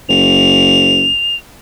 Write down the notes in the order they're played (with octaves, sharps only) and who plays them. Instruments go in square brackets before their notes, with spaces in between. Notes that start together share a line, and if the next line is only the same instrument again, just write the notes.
[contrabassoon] F#1 [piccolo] F7